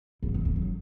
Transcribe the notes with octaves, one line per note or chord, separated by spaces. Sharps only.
F#2
F#2
F2
F#2